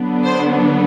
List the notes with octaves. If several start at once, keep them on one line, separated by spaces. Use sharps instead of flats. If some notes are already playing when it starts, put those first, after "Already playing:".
Already playing: D3 F#3 B3 D4
C5